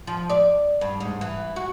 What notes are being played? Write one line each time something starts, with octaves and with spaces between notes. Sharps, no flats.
F3
D5
G2
G#2
E3
F#4